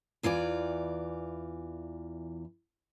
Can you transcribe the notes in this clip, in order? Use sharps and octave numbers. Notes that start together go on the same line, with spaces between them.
E2 E3 F4 D5